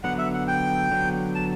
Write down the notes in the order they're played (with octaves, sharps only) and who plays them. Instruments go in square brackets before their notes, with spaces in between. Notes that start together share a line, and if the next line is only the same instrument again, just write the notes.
[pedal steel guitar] D3 F#3 B3 [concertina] F#5
[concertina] E5
F#5
G5
[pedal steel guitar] D3 F#3 B3
[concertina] A5